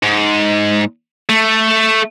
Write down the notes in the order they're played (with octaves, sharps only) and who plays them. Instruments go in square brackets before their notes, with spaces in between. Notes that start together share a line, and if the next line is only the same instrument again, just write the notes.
[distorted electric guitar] G#2
A3